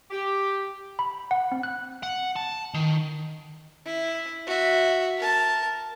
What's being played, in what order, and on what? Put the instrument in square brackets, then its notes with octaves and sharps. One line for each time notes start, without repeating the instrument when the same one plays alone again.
[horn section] G4
[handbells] B5
F#5
C4
F#6
[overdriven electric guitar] F#5
A5
D#3
[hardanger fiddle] E4
F#4 E5
A#4 A5